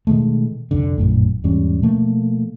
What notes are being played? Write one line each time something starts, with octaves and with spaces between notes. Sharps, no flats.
B2 D#3 G#3 A3
C2 F2 D3
A#1 F#2 A2
E2 G#2 G3 C#4
B2 F3 A3 A#3